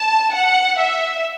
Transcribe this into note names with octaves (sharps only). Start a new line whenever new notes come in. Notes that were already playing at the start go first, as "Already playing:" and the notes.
Already playing: A5
F#5
E5